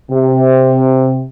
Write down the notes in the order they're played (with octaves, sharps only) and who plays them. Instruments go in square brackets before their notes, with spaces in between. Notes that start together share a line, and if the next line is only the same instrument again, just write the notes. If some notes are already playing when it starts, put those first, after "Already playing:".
[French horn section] C3